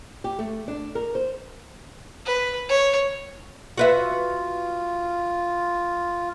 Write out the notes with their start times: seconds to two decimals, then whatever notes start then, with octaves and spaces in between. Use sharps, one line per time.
0.24 G4
0.39 A3
0.68 D4
0.95 A#4
1.15 C5
2.26 B4
2.69 C#5
3.77 F4 F#4 B4 E5